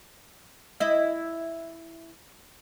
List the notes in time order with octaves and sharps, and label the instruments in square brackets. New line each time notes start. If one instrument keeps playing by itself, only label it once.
[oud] E4 D#5